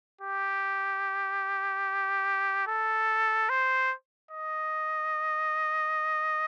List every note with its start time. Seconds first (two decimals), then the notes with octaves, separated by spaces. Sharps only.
0.21 G4
2.67 A4
3.50 C5
4.31 D#5